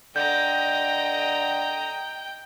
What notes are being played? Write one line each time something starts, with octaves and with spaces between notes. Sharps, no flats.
D3 D#5 G5 A#5 G6